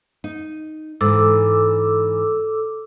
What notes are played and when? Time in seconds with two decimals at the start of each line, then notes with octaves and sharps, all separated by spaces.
0.24 D#4
1.01 G#2 E3 A4 D6 E6